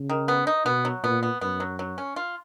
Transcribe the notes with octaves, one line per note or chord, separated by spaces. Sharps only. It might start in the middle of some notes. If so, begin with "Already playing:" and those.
Already playing: C#3
D#3
B3
D#4
B2 B3
F#3
A#2 B3
B3
F#2 B3
F#3
F#3
C#4
F4